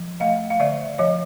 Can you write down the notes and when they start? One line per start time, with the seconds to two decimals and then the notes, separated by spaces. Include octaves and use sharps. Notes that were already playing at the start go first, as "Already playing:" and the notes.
Already playing: F3
0.20 A3 D#5 F5
0.50 F5
0.60 D3 D5 E5
0.98 F3 C#5 D#5